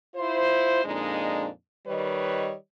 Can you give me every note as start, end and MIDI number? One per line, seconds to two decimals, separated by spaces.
0.16 0.84 64
0.16 0.84 65
0.16 0.84 72
0.85 1.48 41
0.85 1.48 46
0.85 1.48 56
0.85 1.48 62
0.85 1.48 63
1.87 2.54 51
1.87 2.54 55
1.87 2.54 71
1.87 2.54 73
1.87 2.54 75